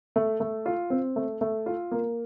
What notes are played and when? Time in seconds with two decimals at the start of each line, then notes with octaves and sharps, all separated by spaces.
0.16 A3
0.40 A3
0.66 F4
0.90 C4
1.16 A3
1.41 A3
1.66 F4
1.91 A#3